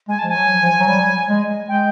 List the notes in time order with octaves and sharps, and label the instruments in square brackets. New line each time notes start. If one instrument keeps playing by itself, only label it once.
[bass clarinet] G#3 [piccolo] G#5
[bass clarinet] F3 [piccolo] A5
[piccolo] G#5
[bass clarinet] F#3
F3
F#3
G3
G#3
[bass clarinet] G#3 [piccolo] G5